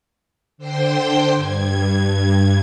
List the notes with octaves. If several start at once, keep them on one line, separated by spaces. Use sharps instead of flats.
D3 C5 G5 C6
G2 G#6